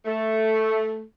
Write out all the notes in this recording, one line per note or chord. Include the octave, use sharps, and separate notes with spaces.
A3